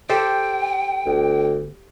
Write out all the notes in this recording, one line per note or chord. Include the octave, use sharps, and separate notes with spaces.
G4 A4 C5 G5
G1 D2